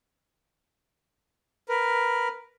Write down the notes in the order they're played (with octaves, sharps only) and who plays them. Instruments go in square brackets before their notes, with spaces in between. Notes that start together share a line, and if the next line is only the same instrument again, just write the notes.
[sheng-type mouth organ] A#4 B4